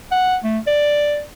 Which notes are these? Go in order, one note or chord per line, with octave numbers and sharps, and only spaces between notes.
F#5
A3
D5